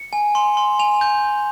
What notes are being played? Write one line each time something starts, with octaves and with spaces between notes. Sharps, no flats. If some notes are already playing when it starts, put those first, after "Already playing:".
Already playing: C#7
G#5
C6
C6
G#5 F7
G6